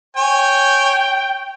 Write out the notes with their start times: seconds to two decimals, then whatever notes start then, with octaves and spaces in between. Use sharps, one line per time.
0.16 C#5 G5 G#5